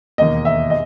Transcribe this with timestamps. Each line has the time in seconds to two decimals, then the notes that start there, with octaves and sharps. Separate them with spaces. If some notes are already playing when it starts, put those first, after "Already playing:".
0.18 E1 D#2 D#3 A#3 D#5
0.45 E5
0.70 D#5